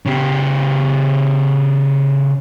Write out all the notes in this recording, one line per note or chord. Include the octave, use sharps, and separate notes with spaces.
C#3 G4